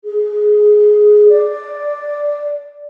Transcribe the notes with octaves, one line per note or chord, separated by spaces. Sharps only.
G#4
D5